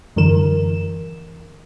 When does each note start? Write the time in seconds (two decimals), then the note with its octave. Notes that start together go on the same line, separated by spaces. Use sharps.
0.16 F#2 D3 E3 A#4 E7